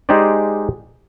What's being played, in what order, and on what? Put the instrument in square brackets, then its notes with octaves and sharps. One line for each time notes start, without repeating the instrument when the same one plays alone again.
[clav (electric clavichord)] G#3 D#4 G4 G#4 C5 D5